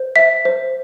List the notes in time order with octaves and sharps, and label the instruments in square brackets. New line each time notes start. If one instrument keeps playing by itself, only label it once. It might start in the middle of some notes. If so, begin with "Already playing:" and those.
Already playing: [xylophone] C5
E5 B6
C5